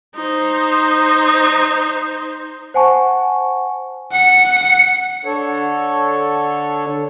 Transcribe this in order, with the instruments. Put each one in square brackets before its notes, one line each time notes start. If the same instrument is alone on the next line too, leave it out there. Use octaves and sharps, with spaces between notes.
[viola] D#4 C5
[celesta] C5 F#5 G#5 A5 C#6
[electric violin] F#5 C#7
[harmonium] D3 D4 A4 C#5